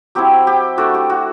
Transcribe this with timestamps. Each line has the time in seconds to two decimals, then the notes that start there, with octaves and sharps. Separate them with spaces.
0.15 F#3 C4 E4 G4
0.47 G4
0.78 A3 D4 F#4 A4
0.94 G4
1.10 F#4